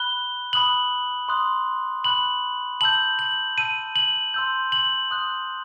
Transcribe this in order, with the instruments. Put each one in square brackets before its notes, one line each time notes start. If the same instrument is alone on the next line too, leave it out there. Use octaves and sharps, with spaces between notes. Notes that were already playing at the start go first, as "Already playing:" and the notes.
Already playing: [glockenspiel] B5 F#6 G7
B5 D#6 F#6 F#7
C6 D#6 F#6
B5 F#6 F#7
A5 E6 G6 F#7
F#7
A5 E6 G6 D#7
F#7
C6 E6 G6
F#7
C6 D#6 F#6